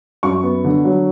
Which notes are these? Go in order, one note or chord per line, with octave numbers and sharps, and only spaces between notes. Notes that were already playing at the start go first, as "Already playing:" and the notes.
F#2 C#6
B3
D3
F#3